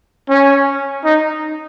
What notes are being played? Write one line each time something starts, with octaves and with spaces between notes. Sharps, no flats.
C#4
D#4